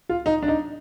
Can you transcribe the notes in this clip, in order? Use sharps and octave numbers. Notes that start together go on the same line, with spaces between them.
F4
D#4
D4
D#4